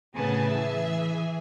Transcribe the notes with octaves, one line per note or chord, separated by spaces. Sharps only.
A2 C#3 B3 G#4 G#5 A5
E3 G#4 E5 G#5